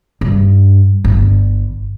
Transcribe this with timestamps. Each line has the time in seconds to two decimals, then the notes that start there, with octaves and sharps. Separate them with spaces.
0.21 G2
1.05 G1